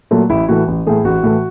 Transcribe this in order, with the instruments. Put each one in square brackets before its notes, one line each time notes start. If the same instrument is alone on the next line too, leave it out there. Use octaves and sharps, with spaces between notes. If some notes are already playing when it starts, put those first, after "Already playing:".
[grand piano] A#2 F#3 A3
A1 E4
A2 E3 A3 F#4
A1
A2 E3 A3 G#4
A1 F#4
A2 E3 A3